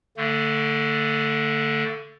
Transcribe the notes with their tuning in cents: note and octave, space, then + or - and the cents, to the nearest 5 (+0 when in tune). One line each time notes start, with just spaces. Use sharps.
D3 +0 A3 +35